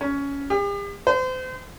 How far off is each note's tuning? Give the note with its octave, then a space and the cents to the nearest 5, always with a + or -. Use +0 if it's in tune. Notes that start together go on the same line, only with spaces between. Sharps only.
C#4 +15
G4 +45
C5 -35